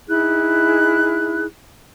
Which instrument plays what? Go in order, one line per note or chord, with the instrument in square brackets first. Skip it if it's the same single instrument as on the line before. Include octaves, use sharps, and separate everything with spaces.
[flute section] D#4 E4 G#4 F#6